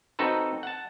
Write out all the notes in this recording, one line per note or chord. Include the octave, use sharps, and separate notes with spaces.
C4 D#4 F#4 A4 B4
F#5 A5